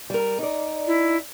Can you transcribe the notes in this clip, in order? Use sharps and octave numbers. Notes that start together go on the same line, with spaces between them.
G3 A#4
D#4 D5
E4